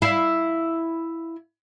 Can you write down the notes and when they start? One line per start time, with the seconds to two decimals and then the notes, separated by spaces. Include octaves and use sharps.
0.02 E4 F5